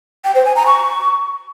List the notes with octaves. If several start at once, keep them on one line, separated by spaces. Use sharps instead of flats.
G5
C5
G#5
A#5
C#6